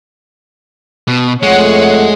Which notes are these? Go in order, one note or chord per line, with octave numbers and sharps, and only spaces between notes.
B2
F2 G#3 A3 C#5 F#5